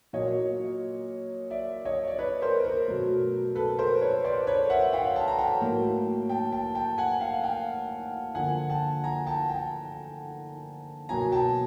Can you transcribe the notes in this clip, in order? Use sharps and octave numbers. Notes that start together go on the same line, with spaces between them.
A#2 F#3 A#3 C#5 D#5
D5 E5
C#5 D#5
D5
B4 C#5
A#4 C5
A#4
B2 F#3 A3
A4 B4
A#4 C5
B4 C#5
C5 D5
B4 C#5
E5 F#5
F5 G5
G5 A5
A#5
G5 A5
A2 F#3 A#3
G5 A5
G5 A5
G5 A5
F#5 G#5
F5 G5
F5 G5
D3 F3 A#3 F#5 G#5
G5 A5
G#5 A#5
G5 A5
G5 A5
B2 F#3 A#3 G#5 A#5
G5 A5